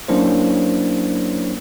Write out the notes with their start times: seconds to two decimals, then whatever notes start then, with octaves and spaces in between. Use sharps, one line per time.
0.08 F#3 A#3 C#4 D4 E4 C5